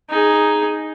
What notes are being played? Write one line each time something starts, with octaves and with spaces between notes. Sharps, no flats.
D#4 G#4